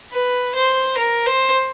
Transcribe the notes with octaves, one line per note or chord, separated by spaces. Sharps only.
B4
C5
A#4
C5